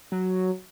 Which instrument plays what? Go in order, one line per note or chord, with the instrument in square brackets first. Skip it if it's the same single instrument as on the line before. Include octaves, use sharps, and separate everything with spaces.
[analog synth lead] F#3